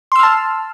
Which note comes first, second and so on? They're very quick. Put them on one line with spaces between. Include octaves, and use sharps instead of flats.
C6 E6 F6 A5